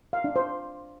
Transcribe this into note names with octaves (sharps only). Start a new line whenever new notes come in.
F5
D4
C5